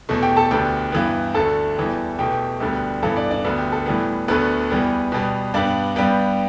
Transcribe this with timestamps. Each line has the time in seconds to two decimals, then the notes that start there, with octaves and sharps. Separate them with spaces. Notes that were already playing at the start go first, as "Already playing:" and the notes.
0.09 E2 B2 A3
0.23 G4 G5
0.36 A4 A5
0.51 D2 D3 B3 G4 G5
0.92 G2 E3 B3
1.34 D2 D3 A3 A4 A5
1.77 E2 E3 G3
2.18 E2 B2 A3 G4 G5
2.60 D2 D3 G3 B3 G4
3.03 G2 E3 B3 A4
3.16 D4 D5
3.31 D4 D5
3.45 D2 D3 B3
3.58 G4
3.72 A4
3.86 A2 E3 G3 B3
4.28 D2 D3 A3 B3 B4
4.70 E2 E3 G3 B3
5.12 B2 G3 B3
5.54 G2 G3 B3 D4 D5
5.96 G2 G3 B3 G4 G5